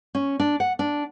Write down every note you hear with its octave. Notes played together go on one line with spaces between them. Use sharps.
C#4
D4
F#5
D4